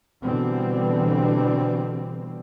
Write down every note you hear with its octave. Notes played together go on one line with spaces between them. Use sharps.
B2 D3 E3 G3 C4